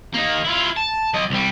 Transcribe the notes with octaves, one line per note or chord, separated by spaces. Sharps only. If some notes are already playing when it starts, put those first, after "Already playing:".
A#3 D#4
E4 F4
A5
F#3 D#5
C2 G3